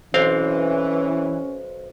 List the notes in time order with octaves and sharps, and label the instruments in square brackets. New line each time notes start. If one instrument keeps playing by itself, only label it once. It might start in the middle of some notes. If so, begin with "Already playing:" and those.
[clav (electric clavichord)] B1 C4 F5 [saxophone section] E3 [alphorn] C#4 [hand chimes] C5